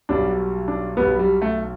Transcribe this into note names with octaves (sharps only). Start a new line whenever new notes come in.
B1 B2 G3 D4
D4
B1 B2 G3 B3
G3
A3